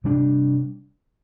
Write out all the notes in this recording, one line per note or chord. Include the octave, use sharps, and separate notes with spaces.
C3 G3 D4